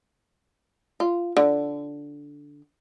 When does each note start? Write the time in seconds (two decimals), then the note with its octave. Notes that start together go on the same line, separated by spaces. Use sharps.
1.00 F4
1.37 D3